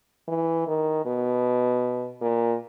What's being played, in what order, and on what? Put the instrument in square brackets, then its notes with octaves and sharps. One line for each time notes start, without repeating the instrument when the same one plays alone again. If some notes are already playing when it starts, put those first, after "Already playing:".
[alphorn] E3
D#3
B2
A#2